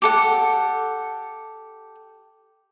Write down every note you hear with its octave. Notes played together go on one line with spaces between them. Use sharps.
G4 A4 F#5